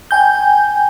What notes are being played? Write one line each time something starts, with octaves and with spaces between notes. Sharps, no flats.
G5 G#5 G6